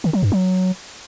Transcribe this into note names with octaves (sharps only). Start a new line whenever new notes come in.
D#3
F#3
G2
F#3